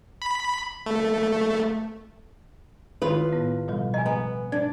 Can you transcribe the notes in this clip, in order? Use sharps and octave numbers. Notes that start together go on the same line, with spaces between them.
B5
A3
D#3 E4 F4 B4
A2 B3
B2 F3 G3
D#5 G#5 A#5
B3
D4 G#6